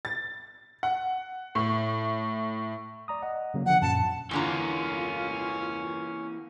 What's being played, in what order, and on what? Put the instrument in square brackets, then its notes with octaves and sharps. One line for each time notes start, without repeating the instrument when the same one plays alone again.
[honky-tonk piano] A6
F#5
A2
[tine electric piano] D5 A#5 D#6
D#5 F#5
C#3 F#3 A#3
[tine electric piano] D3 F3 [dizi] F#5
[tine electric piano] F#2 A#2 C#7 [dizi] A5
[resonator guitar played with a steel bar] E2 D3 A#5 [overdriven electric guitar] E3 A#3 [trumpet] C#4 [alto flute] F4